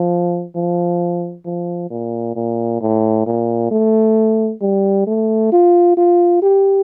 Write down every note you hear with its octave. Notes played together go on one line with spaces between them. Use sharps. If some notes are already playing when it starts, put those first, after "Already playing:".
Already playing: F3
F3
F3
A#2
A#2
A2
A#2
A3
G3
A3
F4
F4
G4